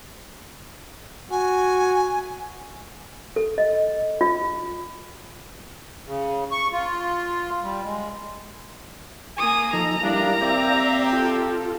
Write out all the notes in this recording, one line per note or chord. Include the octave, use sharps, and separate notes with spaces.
F#4 G#5
A4
D#5
F4
C#3
C#6
F4
G3
G#3
A#3 G#5 D#6
F3 D#4 A4 A#5
G3 A#3 D4 E4 F5
C4 G4 D5 E5
F4 A4